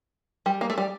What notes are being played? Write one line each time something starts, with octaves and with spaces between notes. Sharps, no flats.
G3
A#3
A3
G3